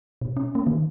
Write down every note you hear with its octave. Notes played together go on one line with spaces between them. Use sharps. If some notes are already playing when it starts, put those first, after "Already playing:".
B2
C#4
A#3
D#3